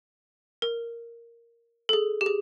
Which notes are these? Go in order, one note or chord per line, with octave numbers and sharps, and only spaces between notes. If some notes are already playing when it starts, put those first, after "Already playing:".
A#4
A4
G#4
G4
G#4